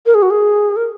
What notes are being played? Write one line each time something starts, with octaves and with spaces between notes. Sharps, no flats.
A#4
G#4
F#4
G#4
A#4